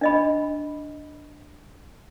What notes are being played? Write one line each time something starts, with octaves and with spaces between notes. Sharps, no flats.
D4 D#5 B5